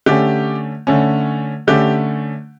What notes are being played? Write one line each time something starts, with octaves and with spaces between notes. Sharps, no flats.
D3 A3 C#4 G4
D3 A3 C#4
D3 A3 C#4 G4